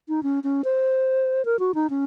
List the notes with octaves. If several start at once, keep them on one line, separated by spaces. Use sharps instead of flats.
D#4
C#4
C#4
C5
A#4
F#4
D#4
C#4